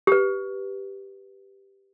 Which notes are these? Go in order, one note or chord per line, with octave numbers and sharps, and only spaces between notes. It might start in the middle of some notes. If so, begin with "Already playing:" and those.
G4 B4